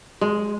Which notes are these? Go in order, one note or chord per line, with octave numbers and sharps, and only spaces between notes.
G#3